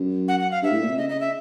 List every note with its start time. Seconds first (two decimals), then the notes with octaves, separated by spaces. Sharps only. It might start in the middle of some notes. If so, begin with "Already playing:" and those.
Already playing: F#2
0.28 F#5
0.40 F#5
0.51 F5
0.63 G2 E5
0.71 A2
0.81 A#2
0.89 C3
0.98 C#3 D#5
1.09 D#5
1.20 E5